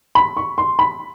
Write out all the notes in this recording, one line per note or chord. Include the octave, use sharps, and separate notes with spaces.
B5
C#6
C6
B5